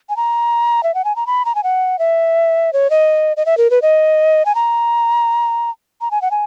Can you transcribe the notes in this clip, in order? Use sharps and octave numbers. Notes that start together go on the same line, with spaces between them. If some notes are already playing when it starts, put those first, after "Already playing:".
G#5
A#5
E5
F#5
G#5
A#5
B5
A#5
G#5
F#5
E5
C#5
D#5
D#5
E5
A#4
B4
D#5
G#5
A#5
A#5
G#5
F#5
G#5